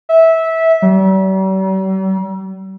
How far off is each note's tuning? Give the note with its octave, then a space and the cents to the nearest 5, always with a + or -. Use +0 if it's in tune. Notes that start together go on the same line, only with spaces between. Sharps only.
E5 -15
G3 -45